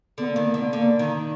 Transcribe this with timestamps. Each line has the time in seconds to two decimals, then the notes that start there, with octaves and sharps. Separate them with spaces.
0.18 D3 B3
0.32 A#3
0.36 D#3
0.45 A#3
0.54 D3 B3
0.73 D3 A#3
0.99 D#3